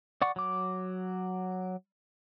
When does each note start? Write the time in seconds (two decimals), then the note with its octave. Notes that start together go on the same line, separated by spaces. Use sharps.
0.22 D5 F#5 C#6
0.36 F#3 D6